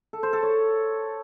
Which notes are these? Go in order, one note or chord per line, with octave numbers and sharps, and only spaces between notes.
A4
C5
A4
C#5